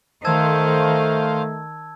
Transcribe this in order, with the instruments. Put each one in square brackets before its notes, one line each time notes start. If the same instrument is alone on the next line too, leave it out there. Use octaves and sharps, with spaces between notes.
[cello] D#3 [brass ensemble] A3 [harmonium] C5 F5 [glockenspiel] A5 E6 G#6